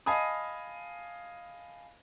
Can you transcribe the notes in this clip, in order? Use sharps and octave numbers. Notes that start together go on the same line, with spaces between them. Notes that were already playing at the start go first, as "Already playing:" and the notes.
D#5 F5 G#5 A5 B5 D#6